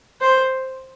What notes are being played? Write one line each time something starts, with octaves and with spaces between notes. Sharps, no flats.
C5